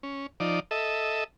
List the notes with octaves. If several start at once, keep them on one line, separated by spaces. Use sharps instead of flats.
C#4
F3 D#4 D5
A4 D#5 E5